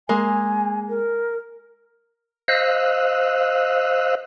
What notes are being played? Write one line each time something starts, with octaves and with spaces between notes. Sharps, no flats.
G#3 A#3 G#5
A#4
C5 D#5 F5 E6 F#6